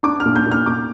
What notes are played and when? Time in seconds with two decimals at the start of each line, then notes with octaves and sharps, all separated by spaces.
0.03 D4 D6
0.20 A#2 F6
0.36 G6
0.46 A#2
0.51 F6
0.66 A#2 D6